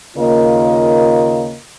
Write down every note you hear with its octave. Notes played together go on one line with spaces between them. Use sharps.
D#2 C#3 A#3 F4 A#4 D#5